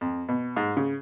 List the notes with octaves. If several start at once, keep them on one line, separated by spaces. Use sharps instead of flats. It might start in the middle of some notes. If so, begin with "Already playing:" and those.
F2
B2
G#2
C#3